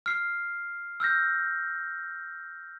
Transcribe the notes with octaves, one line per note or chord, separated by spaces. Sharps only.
F6 C7
E6 F6 G6 A#6